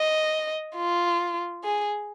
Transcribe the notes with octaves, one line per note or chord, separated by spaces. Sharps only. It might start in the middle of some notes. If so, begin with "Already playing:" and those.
Already playing: D#5
F4
G#4